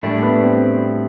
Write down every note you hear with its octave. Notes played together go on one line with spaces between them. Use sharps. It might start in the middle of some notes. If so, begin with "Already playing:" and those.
A2 G3 A3 D4
B3
C4